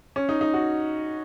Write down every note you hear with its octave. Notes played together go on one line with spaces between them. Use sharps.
C#4
D#4
D#4
F#4